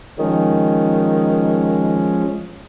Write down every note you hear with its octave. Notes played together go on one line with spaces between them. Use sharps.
D#3 F3 G#3 C#4